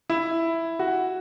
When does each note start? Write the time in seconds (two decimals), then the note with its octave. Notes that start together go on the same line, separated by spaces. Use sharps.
0.10 E4
0.79 F#4